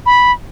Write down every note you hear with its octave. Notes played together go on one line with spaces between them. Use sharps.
B5